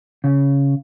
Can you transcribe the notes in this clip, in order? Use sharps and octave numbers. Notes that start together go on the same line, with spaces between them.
C#3